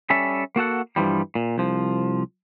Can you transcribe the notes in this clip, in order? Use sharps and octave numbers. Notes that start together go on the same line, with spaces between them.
G3 C#4 A4 E5
A#3 F#4 A4 F#5
G2 E3 F3 G3
A#2
C2 F3